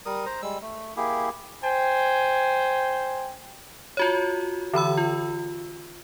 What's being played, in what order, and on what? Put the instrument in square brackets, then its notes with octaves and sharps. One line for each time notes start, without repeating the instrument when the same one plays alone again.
[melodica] G3 A#4 D#6
C5 A#5
G3 G#3 E6
A3
A#3 E4 G4 G#4
[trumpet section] C5 G5 G#5
[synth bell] F4 F#4 C#5
D3 E3 B5 E6
F4